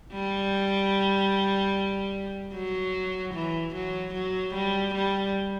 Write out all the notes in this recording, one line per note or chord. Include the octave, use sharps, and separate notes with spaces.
G3
F#3
E3
F#3
F#3
G3
G3